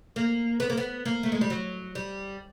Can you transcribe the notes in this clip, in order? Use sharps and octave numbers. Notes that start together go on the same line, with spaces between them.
A#3
B3
A#3
B3
A#3
A3
G#3
G3
F#3
G3